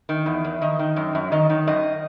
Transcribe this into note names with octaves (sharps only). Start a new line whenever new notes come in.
D#3
E2
E2
D#3 D#5
D#3
F#2
F#2
D#3 D#5
D#3
F#2 D#5